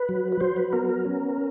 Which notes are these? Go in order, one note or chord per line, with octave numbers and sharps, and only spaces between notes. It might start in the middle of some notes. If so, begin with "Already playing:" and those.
Already playing: B4
F#3
B4
F#3 C5
B4
B3 A#4
A#4
C#4